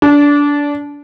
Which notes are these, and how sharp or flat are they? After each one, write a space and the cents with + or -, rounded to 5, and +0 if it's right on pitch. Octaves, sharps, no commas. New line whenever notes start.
D4 -20